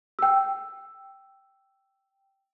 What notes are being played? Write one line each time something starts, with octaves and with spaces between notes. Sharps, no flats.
G5 E6